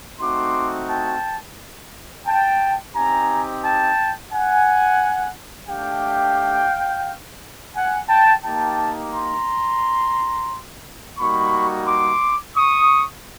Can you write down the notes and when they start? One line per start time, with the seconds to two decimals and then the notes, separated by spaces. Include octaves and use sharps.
0.20 A3 C4 D#4 F#4 C6 D6
0.88 G5 A5
2.26 G5 A5
2.95 C4 D#4 G4 G#5 A#5
3.63 G5 A5
4.32 F#5 G#5
5.69 A3 D4 G4 F5 G5
7.75 F#5 G#5
8.09 G5 A5
8.43 A#3 D#4 G4 G5 A5
9.12 A#5 C6
11.18 G3 A#3 D#4 F#4 B5 C#6
11.87 C6 D6
12.56 C#6 D#6